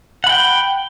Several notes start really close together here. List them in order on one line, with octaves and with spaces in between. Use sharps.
F#5 B5 G5